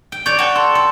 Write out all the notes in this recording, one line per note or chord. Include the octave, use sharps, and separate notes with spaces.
G5
C#5 D5 G6
F#4 G5 C#7 E7
A4 C6
A4 C6